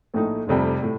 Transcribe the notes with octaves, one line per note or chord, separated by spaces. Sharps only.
A#1 A2 A3 D#4
F1 F2 C3 G3
A2 A3